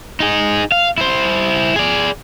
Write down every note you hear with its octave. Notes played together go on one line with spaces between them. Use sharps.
D#4 G#4
F5
E4 C5
G#4 D5